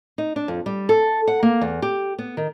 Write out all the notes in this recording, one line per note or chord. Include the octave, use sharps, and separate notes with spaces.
D#4
D4
F2
G3
A4
F#5
A#3
E2
G4
B3
D#3